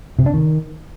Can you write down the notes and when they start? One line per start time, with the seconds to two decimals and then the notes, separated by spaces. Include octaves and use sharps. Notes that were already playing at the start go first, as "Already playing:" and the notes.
0.19 C3
0.26 D4
0.34 D#3